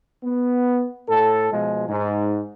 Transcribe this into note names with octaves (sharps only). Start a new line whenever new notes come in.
B3
A2 A4
B2 F3 G#3
G#2